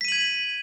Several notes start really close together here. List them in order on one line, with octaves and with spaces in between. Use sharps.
B6 D#7 F#7 G#6